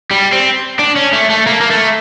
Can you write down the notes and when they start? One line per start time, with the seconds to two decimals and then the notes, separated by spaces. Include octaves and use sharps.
0.11 G3
0.32 C4
0.79 D4
0.96 C#4
1.13 A3
1.30 A3
1.47 A#3
1.61 A#3
1.71 A3